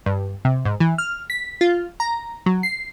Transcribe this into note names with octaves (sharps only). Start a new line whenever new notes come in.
G2
C3
G#2
E3
F6
B6
F4
A#5
F#3
C7